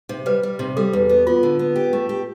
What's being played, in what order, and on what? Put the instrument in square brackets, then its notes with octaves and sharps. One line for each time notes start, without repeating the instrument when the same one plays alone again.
[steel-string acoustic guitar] C3
[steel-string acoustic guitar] G3 [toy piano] B4
[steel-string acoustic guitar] G3
C3
[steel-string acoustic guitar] G3 [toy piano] A4
[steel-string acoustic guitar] E2
B3
[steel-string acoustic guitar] B3 [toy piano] F4
[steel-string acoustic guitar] D3
B3
G4
A3
G4